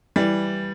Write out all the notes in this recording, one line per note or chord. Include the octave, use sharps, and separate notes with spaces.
E3 G3